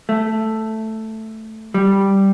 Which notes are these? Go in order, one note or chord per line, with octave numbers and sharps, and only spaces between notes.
A3
G3